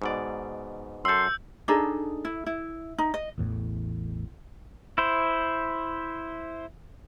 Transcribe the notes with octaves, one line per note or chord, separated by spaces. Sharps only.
G#2 B2 D5
F#2 A4 C6 E6 G6
D4 D#4 G#4 A4
E4
E4
D#4
D#5
A1 E2 A2
E4 C5